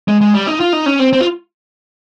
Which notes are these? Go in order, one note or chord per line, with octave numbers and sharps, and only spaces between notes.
G#3
G#3
G3
D#4
F4
D#4
C#4
C4
C4
F4